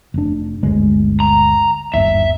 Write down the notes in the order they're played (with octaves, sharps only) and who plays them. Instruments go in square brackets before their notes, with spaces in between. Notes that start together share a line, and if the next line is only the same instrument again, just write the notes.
[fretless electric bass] F1 D4
G1 D2 G#3
[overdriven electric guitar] A#5
[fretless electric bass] G1 D#2 [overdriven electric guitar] E5